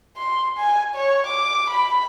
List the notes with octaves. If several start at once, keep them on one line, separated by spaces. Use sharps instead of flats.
C6
G#5
C#5
D6
B5